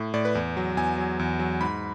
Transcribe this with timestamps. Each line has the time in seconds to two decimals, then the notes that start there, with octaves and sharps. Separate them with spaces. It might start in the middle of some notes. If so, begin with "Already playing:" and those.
Already playing: A2
0.14 A2 D5
0.25 B4
0.35 E2
0.57 F#3
0.77 E2 G#5
0.98 F#3
1.19 E2
1.39 F#3
1.61 G#2 B5